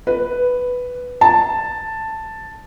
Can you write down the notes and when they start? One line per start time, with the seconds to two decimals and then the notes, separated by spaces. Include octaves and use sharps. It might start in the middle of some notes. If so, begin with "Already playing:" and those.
0.07 B4
1.21 A5